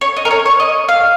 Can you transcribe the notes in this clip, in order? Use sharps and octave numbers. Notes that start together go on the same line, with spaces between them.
C#5
D#5
A#4
C#5
C#5
D#5
F5